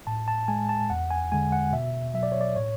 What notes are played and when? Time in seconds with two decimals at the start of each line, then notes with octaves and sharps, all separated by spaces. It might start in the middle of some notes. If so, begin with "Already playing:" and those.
0.07 A2 A5
0.28 A5
0.48 G#3 G#5
0.69 A5
0.90 E2 F#5
1.10 G#5
1.32 D3 G#3 G#5
1.52 F#5
1.72 B2 E5
2.14 F#3 E5
2.23 D5
2.32 C#5
2.41 D5
2.56 A2 C#5